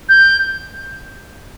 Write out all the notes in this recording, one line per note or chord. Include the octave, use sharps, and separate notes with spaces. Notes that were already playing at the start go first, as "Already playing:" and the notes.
G6